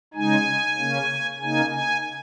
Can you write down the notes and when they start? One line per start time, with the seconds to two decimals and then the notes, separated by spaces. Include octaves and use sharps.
0.14 C#3 G#3 D#4 G#5
0.76 C#3 A#3 C#4
1.39 C#3 A#3 D#4 G#5
1.70 G#5